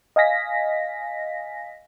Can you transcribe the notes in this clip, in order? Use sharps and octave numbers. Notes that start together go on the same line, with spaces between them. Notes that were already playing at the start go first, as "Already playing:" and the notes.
D#5 F5 G#5 A#6 B6